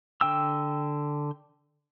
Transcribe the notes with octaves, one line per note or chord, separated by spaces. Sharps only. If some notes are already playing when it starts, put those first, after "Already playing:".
D3 G5 E6